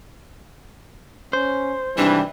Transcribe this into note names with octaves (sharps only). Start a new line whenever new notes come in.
C#4 C5
G#1 C3 E3 G3 D4